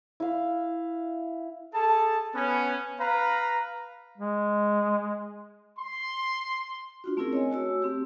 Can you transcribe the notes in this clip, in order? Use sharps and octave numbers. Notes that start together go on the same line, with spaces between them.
E4 F5
G#4 A4 A5
B3 C#4
B4 F5 A#5
G#3
C6
D4 F4 F#4
A3 C4 C#4 E4 G#4 A#4
C#5 D#5 G#5
A3 F#4 C#5 E6
A3 C4 G4